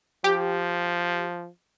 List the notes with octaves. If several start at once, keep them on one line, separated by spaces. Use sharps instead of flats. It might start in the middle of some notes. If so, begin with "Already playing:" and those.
F3 G4